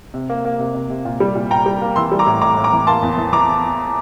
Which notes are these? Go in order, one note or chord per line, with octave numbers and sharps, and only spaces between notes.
C3
A#3
A#3
C3
C3
C3
A#2
G3
A#2
A#2 G5 A#5
G3
A#3
E3 C6 E6
G3
A#5 D6
A2
A2 A#5 D6
A2
A#5 D6
E3
A#3 A5 C6
E2
E3
E3 A#5 D6